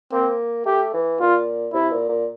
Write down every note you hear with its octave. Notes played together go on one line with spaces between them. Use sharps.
A#3 C4
A3 G4
E3
A#2 F4
C3 E4
A#2
A#2